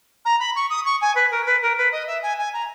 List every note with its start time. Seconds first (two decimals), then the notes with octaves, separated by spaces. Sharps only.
0.25 A#5
0.39 B5
0.55 C#6
0.69 D#6
0.85 C#6
1.01 G#5
1.15 B4
1.31 A#4
1.46 B4
1.62 A#4
1.77 B4
1.92 D#5
2.07 E5
2.22 G#5
2.38 G#5
2.53 A#5